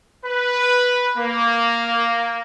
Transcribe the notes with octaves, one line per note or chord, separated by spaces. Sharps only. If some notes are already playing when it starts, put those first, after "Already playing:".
B4
A#3